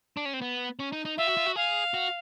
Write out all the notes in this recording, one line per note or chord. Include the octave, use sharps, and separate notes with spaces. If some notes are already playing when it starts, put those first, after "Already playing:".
D4
C#4
C4
B3
C#4
D#4
D#4
F4 E5
F#4
F4
F#4
G#4 F5
F#4